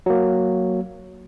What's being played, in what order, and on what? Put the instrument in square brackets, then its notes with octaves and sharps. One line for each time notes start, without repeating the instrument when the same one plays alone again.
[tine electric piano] F#3 A#3